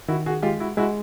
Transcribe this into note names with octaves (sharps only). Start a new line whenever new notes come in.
D#3 E4 F#4
F#4 G#4
G#3 F4 G4
E4 F#4
G#3 E4 F#4